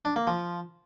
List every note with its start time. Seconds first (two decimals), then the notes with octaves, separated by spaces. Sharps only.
0.05 D4
0.16 A#3
0.27 F3